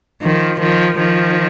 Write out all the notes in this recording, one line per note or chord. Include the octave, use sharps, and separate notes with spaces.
D#3 F3
D#3 F3
D#3 F3